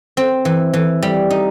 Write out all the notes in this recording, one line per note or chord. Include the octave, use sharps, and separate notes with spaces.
C4
E3
E3
G3
D#4